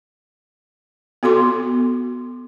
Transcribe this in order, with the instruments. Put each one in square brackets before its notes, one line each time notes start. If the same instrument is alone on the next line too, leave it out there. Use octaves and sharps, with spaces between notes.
[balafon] B3 F#4 A4 C6 D6